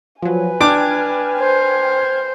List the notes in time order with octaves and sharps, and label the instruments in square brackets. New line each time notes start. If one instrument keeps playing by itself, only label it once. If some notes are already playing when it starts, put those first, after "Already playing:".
[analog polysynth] F3 F#3 [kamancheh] B4 G#5
[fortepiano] D4 D6 [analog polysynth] G5 F6 G#6
[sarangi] C5